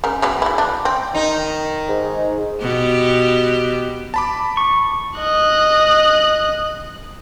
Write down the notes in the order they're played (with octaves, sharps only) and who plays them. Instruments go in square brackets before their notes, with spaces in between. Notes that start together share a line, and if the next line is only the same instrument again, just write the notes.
[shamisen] C#3 A#4
C#3 F#3 B3
E3 E4
D4
C4
[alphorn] D#3 [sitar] D#4
[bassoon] G#2
[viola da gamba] B2 G4
[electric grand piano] A5 B5 D6
[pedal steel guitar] C#6
[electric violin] D#5 F#6